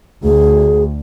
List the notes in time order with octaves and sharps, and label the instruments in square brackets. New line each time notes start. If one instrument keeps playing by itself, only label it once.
[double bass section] D2 [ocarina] G#4